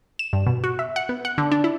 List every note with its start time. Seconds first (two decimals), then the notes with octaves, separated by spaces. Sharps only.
0.19 E7
0.33 G2
0.47 B2
0.64 F#4
0.79 E5
0.96 F#5
1.09 B3
1.25 F#5
1.38 D3
1.52 D4
1.64 E4